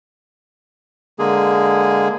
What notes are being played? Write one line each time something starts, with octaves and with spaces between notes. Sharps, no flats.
D3 G#3 A#3 G#4